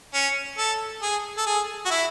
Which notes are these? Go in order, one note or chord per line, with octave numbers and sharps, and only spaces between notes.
C#4
A4
G#4
A4
G#4
F#4
E4